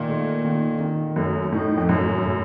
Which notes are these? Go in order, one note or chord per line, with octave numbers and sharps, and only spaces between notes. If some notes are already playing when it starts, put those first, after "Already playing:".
Already playing: A#2 D#3
A3
D#3
D#3
F#2 A3
A2 D#4
F2
F#2 A2
A2